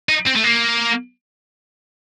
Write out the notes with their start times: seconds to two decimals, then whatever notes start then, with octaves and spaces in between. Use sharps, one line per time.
0.09 D#4
0.26 C4
0.36 A3
0.44 A#3